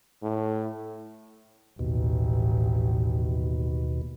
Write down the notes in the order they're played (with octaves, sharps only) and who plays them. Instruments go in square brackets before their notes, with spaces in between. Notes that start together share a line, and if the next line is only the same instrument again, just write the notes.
[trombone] A2
[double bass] A1 [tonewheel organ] D#2 B2